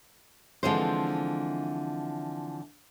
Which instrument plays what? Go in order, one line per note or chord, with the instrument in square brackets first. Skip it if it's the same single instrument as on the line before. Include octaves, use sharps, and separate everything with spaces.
[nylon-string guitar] D3 E3 F3 G#3 C4 C5